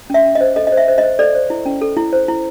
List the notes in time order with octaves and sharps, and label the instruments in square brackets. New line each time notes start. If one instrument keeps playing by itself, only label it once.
[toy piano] C#4 E5
C#4
D#5
C5
A4 D#5
D#5
C5
E5
C5
D#5
C5
A4 D5
C5
E4
C#4
A4
E4
C5
E4